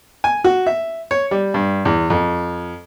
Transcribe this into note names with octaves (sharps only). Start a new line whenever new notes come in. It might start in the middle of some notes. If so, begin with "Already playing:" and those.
G#5
F#4
E5
C#5
G3
G2
E2
F2